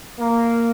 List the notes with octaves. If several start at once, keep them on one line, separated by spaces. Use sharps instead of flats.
A#3